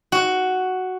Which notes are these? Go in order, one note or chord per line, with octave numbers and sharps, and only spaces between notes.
F#4